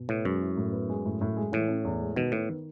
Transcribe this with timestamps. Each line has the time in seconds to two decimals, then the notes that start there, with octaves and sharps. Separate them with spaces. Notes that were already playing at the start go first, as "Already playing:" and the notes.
Already playing: B2
0.09 A2 B3
0.25 F#2 G#3
0.41 E4
0.57 A2
0.72 B3
0.89 G#3
1.05 A2
1.21 A2
1.37 G#3
1.52 A2 E3
1.68 C#4
1.85 E2
2.01 G#3
2.16 B2 D#3
2.32 A2 B3
2.49 D#3